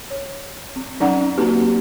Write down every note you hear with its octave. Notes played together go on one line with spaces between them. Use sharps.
C#5
C4
F#3 C#4 D#4 D5 F#5 A#5
A#3 C4 D#4 F#4 G4 B4